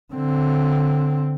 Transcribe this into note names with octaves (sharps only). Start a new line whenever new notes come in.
D3 C4